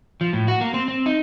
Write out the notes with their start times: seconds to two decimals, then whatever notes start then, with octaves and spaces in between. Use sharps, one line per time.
0.21 F3
0.33 A2
0.48 F#4
0.61 A#3
0.74 C4
0.88 C4
1.06 D#4